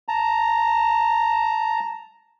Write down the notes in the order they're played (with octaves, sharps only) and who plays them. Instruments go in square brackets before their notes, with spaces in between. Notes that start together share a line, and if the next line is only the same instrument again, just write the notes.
[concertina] A5 A#5